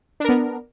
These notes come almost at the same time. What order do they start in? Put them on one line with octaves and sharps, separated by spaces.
D4 A#4 B3